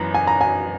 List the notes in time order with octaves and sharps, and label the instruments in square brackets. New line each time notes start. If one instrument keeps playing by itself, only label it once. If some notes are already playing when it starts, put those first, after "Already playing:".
Already playing: [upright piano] F#2 E3 B3 [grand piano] A#5
[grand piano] G#5
A#5
G#5